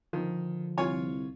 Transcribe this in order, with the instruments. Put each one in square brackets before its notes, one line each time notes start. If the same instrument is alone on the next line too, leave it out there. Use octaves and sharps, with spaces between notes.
[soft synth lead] D3 [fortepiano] D#3 [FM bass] F3
[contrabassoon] C2 [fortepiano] F4 C#5 G#5